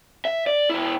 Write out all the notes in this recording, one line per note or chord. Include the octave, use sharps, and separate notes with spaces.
E5
D5
B2 E4